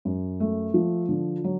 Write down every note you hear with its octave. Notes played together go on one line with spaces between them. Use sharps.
F#2
A3
F3
D3
F#3